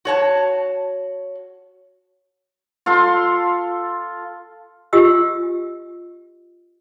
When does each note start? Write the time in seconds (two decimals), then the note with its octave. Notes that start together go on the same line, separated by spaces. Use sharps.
0.05 F#4 C#5 A5
2.86 F4 A4 C6
4.93 F4 G4 D#5 E6